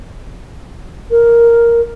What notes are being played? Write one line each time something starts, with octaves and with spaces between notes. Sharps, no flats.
A#4